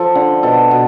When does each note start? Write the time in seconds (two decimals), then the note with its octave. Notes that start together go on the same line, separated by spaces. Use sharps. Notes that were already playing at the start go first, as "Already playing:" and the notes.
Already playing: F3 A4
0.15 D3
0.43 B2 A4
0.71 B2